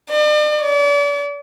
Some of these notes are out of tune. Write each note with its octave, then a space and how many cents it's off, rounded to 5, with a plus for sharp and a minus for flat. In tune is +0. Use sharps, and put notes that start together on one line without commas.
D5 +40
D5 -40